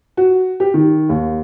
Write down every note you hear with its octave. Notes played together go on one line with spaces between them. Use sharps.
F#4
G4
D#3
D#2